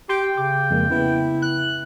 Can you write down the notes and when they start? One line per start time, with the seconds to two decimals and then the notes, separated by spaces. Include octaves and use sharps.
0.09 G4 G5 C6
0.37 C#3 D6
0.71 F2 G#3 A#3
0.90 C#3 B3 E4
1.42 F#6